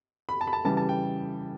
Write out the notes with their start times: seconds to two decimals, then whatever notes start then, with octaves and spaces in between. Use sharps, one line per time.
0.29 B5
0.41 A5
0.47 B5
0.53 A5
0.65 C#3 E3 G3 A5
0.77 A5
0.89 G5